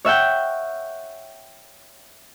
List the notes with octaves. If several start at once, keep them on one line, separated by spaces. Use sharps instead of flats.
C#5 E5 F#5 G5